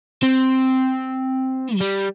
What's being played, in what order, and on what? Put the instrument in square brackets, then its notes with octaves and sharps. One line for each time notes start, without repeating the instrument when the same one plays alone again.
[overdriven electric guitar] C4
F#3
G3